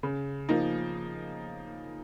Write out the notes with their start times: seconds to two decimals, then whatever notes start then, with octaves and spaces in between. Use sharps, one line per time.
0.03 C#3
0.49 F3 A#3 D#4